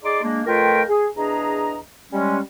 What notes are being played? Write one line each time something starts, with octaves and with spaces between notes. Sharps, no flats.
D#4 G#4 D5 C6 D6
G#3 A#3 D4
F2 A3 F4 A#4 B4 G5
G#4
E2 D4 G#4 D#5 A#5
G3 G#3 C#4